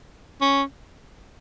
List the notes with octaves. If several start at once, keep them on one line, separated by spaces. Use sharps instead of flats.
C#4